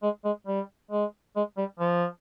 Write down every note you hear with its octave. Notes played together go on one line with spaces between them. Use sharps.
G#3
G#3
G3
G#3
G#3
G3
F3